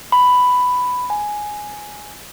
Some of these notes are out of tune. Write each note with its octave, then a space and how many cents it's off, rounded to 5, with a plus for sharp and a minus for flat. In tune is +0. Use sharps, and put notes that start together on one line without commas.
B5 +10
G#5 +5